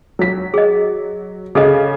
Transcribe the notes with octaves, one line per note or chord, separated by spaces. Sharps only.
F#3 B6
G#4 D#5
C#3 G#4 A4 D#5